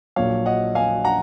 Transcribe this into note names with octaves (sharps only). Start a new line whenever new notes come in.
A#1 A#2 F#3 C#5 F5
D#5 F#5
F5 G#5
F#5 A#5